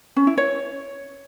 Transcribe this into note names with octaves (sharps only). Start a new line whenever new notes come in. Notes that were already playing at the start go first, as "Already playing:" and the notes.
C#4
E4
C#5